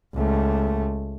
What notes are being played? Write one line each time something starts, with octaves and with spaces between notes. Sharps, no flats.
C#2 A3